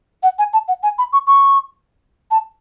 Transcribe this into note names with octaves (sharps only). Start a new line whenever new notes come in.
F#5
G#5
A5
F#5
G#5
B5
C#6
C#6
A5